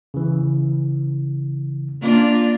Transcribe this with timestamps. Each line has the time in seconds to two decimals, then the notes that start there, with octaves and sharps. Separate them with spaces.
0.14 C#3 E3
2.01 A#3 D4 F4